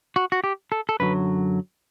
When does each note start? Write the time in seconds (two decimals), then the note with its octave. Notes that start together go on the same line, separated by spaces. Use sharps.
0.16 F#4
0.32 F#4
0.44 G4
0.72 A4
0.89 A4
1.00 F#2 D3 F#3 B4